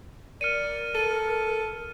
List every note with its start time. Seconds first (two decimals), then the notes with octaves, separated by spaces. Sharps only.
0.41 A#4 D5 F6 C#7 D#7
0.95 A4 D#7